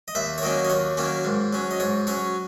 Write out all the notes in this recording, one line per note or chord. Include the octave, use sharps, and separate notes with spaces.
D#5
D#2 E5
C#5
D#3 F#3 A#3 C#4 D#5
D#5
D#2 C#5
D#3 F#3 A#3 C#4
G#2
F#3 C#4
D#5
G#2 C#5
F#3 C#4 C#5